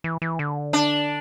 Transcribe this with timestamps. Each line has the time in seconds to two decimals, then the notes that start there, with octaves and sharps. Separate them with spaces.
0.04 E3
0.22 E3
0.39 D3
0.73 D4